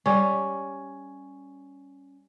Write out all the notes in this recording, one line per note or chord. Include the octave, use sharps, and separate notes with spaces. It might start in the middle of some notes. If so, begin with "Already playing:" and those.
G3 C#4